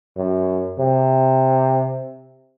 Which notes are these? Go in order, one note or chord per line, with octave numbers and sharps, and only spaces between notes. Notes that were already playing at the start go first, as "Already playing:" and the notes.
F#2
C3